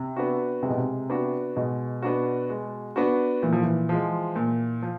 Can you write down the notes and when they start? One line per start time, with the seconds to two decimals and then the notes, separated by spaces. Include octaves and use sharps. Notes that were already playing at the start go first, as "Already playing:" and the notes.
Already playing: C3
0.16 B3 D4 F#4
0.63 C3 G#3
0.70 B2
0.77 C3
1.09 B3 D4 F#4
1.56 B2 G#3
2.02 B3 D4 F#4
2.50 G#3
2.96 B3 D4 F#4
3.42 A#2 E3
3.52 F3
3.63 E3
3.89 F3 G#3
4.36 A#2
4.82 F3